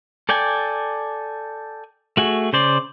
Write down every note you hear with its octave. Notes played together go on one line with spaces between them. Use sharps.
A4 D5 G5 G#5
A3 F#4 G#4
C#3 C5 D5